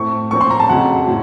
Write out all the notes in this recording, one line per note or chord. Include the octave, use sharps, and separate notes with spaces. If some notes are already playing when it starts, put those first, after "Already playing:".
Already playing: A2 A3 C4 C#6
A#2 F3 C4 C#6
C6
A#5
A5
F2 C#3 F#3 F#5
A2 F#3